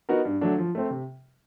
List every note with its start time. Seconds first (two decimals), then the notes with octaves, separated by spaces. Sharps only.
0.09 B3 D#4 F#4 A#4
0.25 G2
0.41 D3 F#3 A3 D4
0.58 F3
0.75 A3 C4
0.90 C3